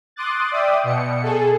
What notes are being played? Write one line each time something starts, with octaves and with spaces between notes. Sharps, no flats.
C6 D6 D#6 F#6 A6
D5 E5 G5 D#6
B2 C#7
G#4 A4